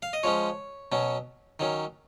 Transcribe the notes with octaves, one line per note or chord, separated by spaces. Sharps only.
F5
D#5
F3 G#3 C#4 C#5
B2 F#3 C#4
D#3 F#3 C#4